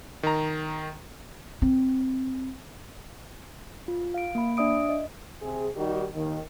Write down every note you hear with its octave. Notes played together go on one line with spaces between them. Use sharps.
D#3 A#5
C4
F4
F5 D7
A#3 B5
D4 D5 E5 D#6 D7
D#5
C3 C4 G#4
D#3 G3 D#4 F#4 G4
D#2 D#3